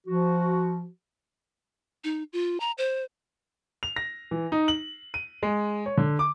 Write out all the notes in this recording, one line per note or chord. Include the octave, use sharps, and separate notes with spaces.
F3 F#4
D#4
F4
A#5
C5
F7
A#6
E3
D#4
F#7
D#7
G#3
C#5
D3
D6